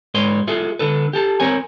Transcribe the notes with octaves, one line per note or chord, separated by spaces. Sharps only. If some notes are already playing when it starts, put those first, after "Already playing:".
G#2 B4 C#5 C6
F4 G#4 A4 E5
D3 A4 B4
G4 A4 A5
C4 A#4 C#5 G#5